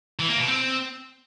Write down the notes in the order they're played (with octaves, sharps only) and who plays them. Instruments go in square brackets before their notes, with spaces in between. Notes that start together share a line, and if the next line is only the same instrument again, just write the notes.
[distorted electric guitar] E3
A#3
B2
C4